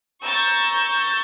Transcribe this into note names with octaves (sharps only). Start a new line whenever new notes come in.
A#5 C#6 E6 G6 A6